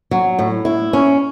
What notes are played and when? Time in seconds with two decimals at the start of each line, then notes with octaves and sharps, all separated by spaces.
0.11 F#3
0.39 A2
0.65 E4
0.93 C#4